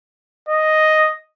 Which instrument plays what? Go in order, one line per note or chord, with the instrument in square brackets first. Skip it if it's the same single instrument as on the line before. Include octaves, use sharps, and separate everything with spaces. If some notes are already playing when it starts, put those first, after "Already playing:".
[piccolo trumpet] D#5